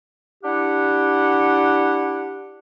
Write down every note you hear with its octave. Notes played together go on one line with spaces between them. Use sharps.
D4 E4 G4 F#5